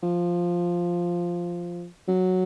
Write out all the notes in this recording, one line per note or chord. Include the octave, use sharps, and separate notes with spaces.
F3
F#3